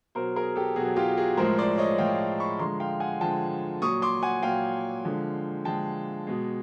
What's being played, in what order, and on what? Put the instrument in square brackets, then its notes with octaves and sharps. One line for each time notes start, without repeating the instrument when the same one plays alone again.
[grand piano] B2 F#3 A#4 C5
G#4 A#4
G4 A4
B2 F#4 G#4
F#3
F4 G4
F#4 G#4
A2 F3 G#3 A#4 C5
C5 D5
C#5 D#5
A2 F3 G#3 F5 G5
B5 C#6
D3 F3 G#3 A#5 C6
F5 G5
F#5 G#5
D3 F3 G#3 G5 A5
A#2 F#3 C#6 D#6
C6 D6
F#5 G#5
A#2 F#3 F5 G5
D3 F3 G#3
D3 F3 G#3 G5 A5
B2 G#3